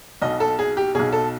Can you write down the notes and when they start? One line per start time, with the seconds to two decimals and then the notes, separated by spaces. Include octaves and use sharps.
0.22 B1 B2 D#5
0.40 A4
0.59 G#4
0.77 G4
0.95 B1 B2 G#4
1.13 A4